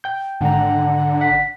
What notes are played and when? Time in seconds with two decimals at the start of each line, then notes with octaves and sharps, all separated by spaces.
0.04 G5 G6
0.41 G#1 D3 F#5 A#5
1.21 F#5 B6